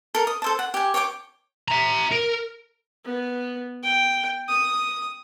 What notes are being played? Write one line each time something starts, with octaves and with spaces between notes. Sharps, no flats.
A4 A#4
D#6
A4 C5 A5
F#5
G4 G#5
C#5 G5 G#5 D6
E5 A#5
A#4
B3
G5
D#6